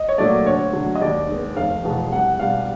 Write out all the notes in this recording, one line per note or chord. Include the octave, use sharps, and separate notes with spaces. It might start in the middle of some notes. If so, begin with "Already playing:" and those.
Already playing: D#5
C#5
A#2 F#3 A3 D5
D2 C#5
D3 F#3
D#5
D#2 D5
D#3 G#3 B3
F1 F5
E2 B2 G#3
C2 F#5
F#5
B2 G3 F5